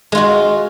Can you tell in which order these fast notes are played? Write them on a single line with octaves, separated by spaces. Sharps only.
G#3 F4 F#4